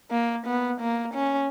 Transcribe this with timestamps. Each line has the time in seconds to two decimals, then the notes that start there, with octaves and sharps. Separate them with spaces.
0.11 A#3
0.46 B3
0.81 A#3
1.14 C#4